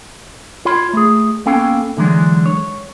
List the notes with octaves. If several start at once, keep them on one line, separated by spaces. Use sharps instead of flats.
F4 C#5 B5 C6
A3 G#4
A#3 B3 C#4 A4 F5 G5
D3 E3 F#3 G#3 D4
C#5